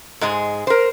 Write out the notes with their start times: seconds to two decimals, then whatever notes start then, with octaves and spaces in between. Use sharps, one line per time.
0.21 G#2 G#3 G#4
0.67 A#4 C5